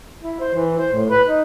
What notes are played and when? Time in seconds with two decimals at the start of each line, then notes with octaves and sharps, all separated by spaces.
0.22 E4
0.40 C5
0.54 E3
0.78 C5
0.93 A2
1.10 B4
1.27 D#4